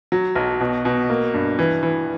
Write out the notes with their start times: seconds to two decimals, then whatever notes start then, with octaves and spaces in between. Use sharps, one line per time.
0.12 F#3
0.36 B1
0.60 B2
0.85 B2
1.10 A#3
1.34 G2
1.59 E3
1.83 E3